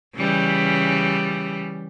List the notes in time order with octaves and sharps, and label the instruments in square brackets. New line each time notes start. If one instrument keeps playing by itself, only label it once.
[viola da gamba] C#3 E3 G3